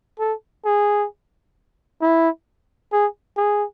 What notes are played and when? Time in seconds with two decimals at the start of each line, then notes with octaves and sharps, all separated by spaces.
0.19 A4
0.65 G#4
2.01 E4
2.92 G#4
3.37 G#4